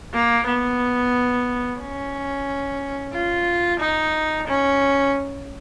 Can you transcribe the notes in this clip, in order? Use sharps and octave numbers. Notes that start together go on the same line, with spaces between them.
A#3
B3
C#4
F4
D#4
C#4